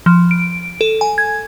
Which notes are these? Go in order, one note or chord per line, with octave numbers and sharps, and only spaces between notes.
F3
D7
A4
G#5
G#6